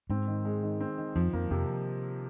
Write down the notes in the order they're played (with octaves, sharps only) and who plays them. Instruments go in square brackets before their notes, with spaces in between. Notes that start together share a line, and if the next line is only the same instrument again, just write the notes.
[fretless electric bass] G#2 [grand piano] C4
[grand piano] D#3
G#3
D#3
C4
D#3
[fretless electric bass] F2 [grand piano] F3
[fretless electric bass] F2 [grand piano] A#3
[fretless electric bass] F2 [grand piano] C3